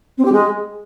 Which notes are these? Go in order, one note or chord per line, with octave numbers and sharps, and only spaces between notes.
C4
G4
G#3